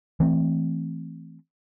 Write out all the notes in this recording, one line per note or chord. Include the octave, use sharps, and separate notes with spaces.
E3 A3 C4